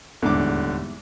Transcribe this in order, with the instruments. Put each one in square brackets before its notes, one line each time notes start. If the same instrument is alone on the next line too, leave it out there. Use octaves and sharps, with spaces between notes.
[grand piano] D#1 D3 [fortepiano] E2 G#2 D6